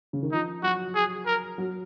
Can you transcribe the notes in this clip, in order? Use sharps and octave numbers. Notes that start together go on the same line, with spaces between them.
C#3
D#3
F3 D#4
F#3 F#4
G#4
A#4
F#3